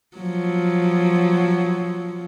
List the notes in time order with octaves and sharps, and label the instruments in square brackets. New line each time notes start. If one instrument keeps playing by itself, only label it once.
[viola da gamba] F3 F#3